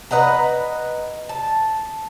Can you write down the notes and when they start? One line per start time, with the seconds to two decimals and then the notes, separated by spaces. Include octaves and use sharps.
0.11 B4 D#5 F#5 A#5
1.29 A5